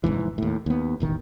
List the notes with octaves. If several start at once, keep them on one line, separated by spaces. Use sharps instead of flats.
F1 A#1 G#2 E3
D#2 A2
D#2 B3
E1 A1 D#3